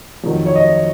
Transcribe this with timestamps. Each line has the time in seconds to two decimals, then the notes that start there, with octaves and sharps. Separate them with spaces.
0.24 F2 D#3 F#3
0.46 C#5
0.56 D#5